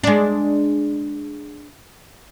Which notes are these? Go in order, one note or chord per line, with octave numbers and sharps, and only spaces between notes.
G#3 D4